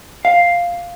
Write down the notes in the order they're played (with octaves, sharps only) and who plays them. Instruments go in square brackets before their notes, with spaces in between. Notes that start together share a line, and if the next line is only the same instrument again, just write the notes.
[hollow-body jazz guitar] F5